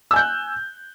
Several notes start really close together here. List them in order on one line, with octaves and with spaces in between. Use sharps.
E6 G#5 G6 F#6